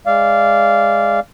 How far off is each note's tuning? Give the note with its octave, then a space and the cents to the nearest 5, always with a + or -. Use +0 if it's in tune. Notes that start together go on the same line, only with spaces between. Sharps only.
G#3 -10 D5 -15 F5 -15